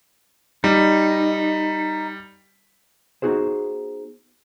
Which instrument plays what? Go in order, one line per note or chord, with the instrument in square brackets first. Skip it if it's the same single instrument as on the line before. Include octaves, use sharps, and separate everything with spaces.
[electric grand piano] G3 [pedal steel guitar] D#4
[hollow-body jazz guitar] B3 D#4 F#4 G#4 C5